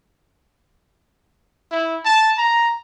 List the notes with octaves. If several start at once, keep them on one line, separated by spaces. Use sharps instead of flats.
E4
A5
A#5